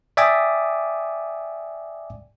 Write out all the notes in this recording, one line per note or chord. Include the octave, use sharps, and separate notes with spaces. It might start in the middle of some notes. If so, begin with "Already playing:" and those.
D5 E5 G5 G#5 D6 D#6